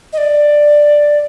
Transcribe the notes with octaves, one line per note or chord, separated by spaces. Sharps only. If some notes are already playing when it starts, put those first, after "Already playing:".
D#5
D5